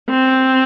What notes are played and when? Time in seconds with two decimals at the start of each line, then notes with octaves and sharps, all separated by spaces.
0.10 C4